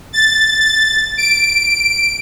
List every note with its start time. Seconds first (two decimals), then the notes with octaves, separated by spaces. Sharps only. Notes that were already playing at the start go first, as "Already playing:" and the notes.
0.13 A6
0.61 A6
1.17 D7